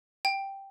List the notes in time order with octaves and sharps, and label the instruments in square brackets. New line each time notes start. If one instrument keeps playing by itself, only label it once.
[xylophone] G5